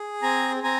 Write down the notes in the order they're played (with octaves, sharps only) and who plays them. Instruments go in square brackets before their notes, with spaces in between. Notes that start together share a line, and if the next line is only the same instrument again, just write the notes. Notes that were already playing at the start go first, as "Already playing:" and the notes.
Already playing: [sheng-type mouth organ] G#4
C4 G#5 A#5
C4 G#5 A#5